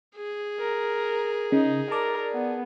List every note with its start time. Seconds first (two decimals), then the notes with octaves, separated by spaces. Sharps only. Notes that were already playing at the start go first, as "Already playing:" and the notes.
0.15 G#4
0.60 A#4
1.52 C#3 D#4
1.91 A#4 D5 A5
2.33 B3